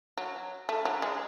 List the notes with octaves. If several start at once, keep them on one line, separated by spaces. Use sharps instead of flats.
F#3
A3
F#3
G#3